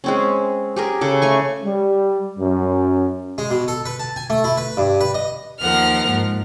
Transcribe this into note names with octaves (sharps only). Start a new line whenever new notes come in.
G#3 C4 C#4
G4 G#4 A#4
C#3 A4
A3 G#5 C#6
G3
F#2
G#3
B2
A4
B4
A5
G#5
A3
E4
B4
G2
B4
D#5
D#2 F3 A#3 A#4 F#5 F6
G#2